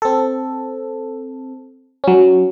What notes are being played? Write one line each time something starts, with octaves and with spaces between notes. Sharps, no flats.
C4 A4
F#3 C#4